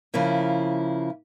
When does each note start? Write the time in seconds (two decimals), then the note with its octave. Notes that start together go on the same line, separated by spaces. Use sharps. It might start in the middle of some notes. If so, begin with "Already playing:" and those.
0.14 C#3 F3 A#3 E4